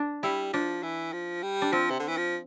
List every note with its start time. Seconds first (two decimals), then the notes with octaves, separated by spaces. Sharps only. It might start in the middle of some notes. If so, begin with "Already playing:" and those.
Already playing: D4
0.23 G3 E4
0.53 F3 D4
0.83 E3
1.13 F3
1.43 G3
1.62 D4
1.72 F3 C4
1.90 C3
2.00 D3
2.08 E3
2.17 F3